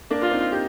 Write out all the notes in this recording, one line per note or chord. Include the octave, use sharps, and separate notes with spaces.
A#3 D4
F4
C4 D#4
D#4 G4